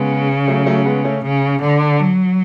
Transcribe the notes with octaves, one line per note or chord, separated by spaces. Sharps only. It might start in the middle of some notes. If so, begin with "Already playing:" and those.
Already playing: C#3 G#3 B3
F#3 A3
F#3 A3
G#3 B3
A3 C#4
C#3
D3
F#3